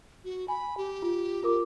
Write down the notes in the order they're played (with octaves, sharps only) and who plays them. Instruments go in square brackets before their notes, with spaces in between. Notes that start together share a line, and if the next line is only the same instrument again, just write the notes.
[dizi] F#4
[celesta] G#5 [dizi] B5
[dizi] G4
[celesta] F4
F4 A#4 D6